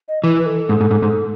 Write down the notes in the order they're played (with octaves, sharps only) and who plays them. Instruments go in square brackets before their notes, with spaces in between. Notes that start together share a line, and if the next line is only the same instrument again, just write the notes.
[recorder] D#5
[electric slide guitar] E3 [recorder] B4
[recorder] B4
A4
[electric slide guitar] G#2
G#2
G#2
G#2